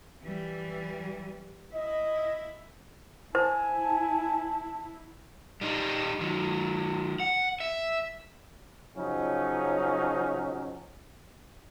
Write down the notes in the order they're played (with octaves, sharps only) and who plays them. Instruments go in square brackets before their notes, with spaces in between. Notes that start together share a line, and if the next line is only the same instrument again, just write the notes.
[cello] E3 G3
[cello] E4 [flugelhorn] D#5
[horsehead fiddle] E4 [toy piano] C5 [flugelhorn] G#5 [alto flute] A5
[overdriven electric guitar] G3 D#4
D#3 F#3
F#5
E5
[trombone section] C#3 F3 F#3 C#4 D#4